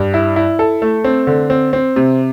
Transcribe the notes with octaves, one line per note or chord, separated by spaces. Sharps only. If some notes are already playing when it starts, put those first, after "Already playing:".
Already playing: G2
E4
E4
A4
A3
C4
D3
C4
C4
C3